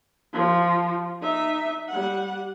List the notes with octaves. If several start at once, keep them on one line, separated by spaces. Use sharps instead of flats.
F3
D#4 E5
G3 F#5